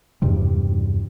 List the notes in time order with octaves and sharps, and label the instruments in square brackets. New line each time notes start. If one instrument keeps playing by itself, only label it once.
[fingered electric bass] E2 G2 C3 G3